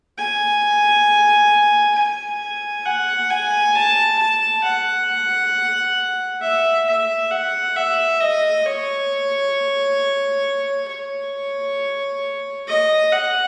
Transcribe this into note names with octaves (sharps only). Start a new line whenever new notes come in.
G#5
G#5
F#5
G#5
A5
A5
F#5
E5
E5
F#5
E5
D#5
C#5
C#5
D#5
F#5